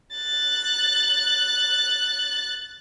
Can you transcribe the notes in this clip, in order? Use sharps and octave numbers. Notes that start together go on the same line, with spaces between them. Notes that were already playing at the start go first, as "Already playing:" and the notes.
F#6 A6